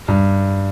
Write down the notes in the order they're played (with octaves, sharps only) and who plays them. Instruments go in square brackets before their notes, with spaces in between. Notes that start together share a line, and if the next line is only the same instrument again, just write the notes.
[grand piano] G2